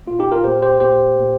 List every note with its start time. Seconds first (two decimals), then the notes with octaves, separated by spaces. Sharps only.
0.07 A#2 A#3 F4
0.19 D#4 G4
0.32 F4 A#4
0.44 A#2 A#3 G4 C5
0.62 G4 C5
0.80 A#2 A#3 G4 C5
1.19 A#2 A#3